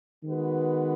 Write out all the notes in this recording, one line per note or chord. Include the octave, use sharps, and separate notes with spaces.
D#3 G#3 B3 F#4 B4